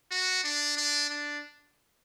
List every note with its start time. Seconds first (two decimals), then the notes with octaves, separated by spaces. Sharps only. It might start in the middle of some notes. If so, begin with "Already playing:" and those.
0.11 F#4
0.44 D4
0.77 D4
1.10 D4